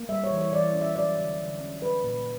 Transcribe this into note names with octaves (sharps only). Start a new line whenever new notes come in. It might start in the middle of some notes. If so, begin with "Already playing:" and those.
Already playing: A#3
G3 E5
C#5
E3
C#5
E3 D5
C#4
E5
F#3 D5
D3
D3
C#4
F#3 B4
A#2